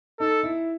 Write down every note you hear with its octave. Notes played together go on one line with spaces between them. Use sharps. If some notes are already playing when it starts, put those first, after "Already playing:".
D#4 A4
E4